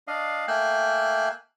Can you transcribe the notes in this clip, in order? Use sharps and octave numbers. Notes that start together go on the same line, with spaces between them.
D4 D#5 F5
A3 A#3 G5 G#5 E6 F#6